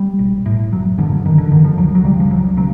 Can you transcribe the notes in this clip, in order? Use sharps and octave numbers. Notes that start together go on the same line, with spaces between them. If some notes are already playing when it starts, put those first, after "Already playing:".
Already playing: G3
A#1
A2
F#1 F#3
F#2 D3 F3
F#1 D#3
D3
F#2 D3 D#3
F3
C#2 F#3
F#3
C#3 G3
F3
C#2 F#3
C#3 F#3